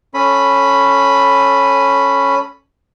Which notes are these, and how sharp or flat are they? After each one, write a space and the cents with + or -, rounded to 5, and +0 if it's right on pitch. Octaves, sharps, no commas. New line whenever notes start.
C#4 -5 A4 +0 B5 +0